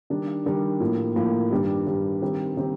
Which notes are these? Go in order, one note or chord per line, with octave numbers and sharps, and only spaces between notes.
D#3 G3 D4
D#3 G3 D4
A2 F3 A#3
A2 F3 A#3
G2 D#3 G3 D4
G2 D#3 G3 D4
D#3 G3 C4 G4
D#3 G3 C4 G4